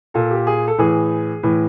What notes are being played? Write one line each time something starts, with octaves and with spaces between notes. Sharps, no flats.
A#2 A4
G4
G#4
A4
A2 E3 G#4
A2 E3